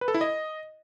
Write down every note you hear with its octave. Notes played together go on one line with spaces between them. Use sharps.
B4
A4
E4
D#5